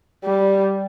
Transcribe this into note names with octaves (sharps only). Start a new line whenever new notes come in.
G3